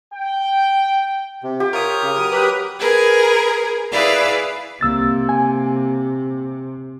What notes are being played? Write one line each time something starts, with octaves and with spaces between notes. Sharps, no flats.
G5
C3
G4
F4 A#4 C#5 D#6
C#3
F#3
G4 B4 B5
G#4 A#4 B4
E4 G#4 B4 D5 F5
C2 C3 A#3 E6 A6
G#5